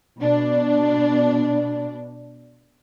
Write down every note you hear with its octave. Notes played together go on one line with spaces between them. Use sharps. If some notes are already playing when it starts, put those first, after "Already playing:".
B2 D4